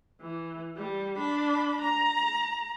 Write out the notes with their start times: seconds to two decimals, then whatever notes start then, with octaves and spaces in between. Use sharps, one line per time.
0.21 E3
0.76 G3
1.17 D4 B5
1.82 A#5